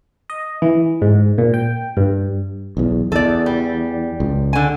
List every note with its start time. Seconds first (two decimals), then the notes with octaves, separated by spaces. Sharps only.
0.30 D#5
0.62 E3
1.02 G#2
1.38 A#2
1.54 G5
1.97 G2
2.77 B1 E2
3.12 E2 A4 D5
3.46 G3
4.20 C#2
4.53 D3 G#5